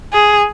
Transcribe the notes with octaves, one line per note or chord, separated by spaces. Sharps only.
G#4